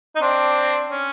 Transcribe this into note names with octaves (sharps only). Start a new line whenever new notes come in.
D#4
C4 D4
C#4